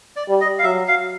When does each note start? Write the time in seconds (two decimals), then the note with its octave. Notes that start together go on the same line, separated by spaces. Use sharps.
0.16 D5
0.29 G3
0.41 D#5
0.59 F5
0.64 F#3 E5
0.88 F5